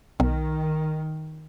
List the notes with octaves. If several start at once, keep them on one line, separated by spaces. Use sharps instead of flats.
B1 D#3